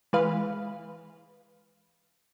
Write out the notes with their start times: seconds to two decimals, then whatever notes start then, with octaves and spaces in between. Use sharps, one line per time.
0.13 E3 G#3 B4 F5